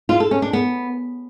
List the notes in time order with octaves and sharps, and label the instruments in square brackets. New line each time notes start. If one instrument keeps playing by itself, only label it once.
[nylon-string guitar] F4
A4
C#4
D4
B3